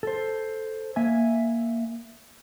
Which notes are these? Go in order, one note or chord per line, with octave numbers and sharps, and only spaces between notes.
A4 C5
A#3 E5 G#5